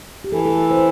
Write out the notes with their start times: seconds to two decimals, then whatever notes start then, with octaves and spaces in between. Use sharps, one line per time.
0.24 G4
0.32 E3 A4
0.46 A4
0.71 C5